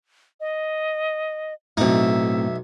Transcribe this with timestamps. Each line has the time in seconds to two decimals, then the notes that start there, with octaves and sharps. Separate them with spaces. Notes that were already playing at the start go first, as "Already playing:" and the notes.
0.40 D#5
1.77 B1 A2 C4 D#4 E5